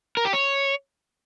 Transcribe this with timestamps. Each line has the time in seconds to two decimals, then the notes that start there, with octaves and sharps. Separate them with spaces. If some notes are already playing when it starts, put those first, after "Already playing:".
0.17 A#4
0.25 G4
0.33 C#5